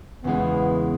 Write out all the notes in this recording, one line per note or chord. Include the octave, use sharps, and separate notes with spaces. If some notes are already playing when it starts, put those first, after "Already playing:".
E2 C#3 E3 G#3 B3